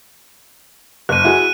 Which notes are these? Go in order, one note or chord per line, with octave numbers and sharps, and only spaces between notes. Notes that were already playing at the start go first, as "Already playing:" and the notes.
F#1 F#6 D#7
E4 F#4 G#4